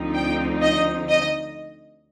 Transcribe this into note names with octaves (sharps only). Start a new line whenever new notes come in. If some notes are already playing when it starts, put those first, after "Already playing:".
Already playing: D2 D3 F3 C4 D#4
G5
D#5
D#5